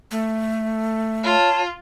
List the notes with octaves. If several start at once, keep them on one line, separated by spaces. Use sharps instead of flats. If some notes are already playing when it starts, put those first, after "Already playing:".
A3
F4 C#5 A5